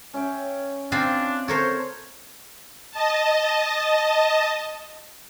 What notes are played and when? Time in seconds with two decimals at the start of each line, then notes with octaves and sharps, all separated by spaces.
0.14 C#4 E5 G5
0.92 C4 D4 F4 C5
1.48 A4 A#4 C5 C#5
2.91 D#5 A5